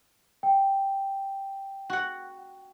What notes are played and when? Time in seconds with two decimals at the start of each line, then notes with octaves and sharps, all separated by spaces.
0.43 G5
1.90 F#4 F#5